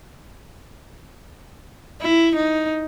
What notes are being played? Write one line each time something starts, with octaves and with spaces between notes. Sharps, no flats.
E4
D#4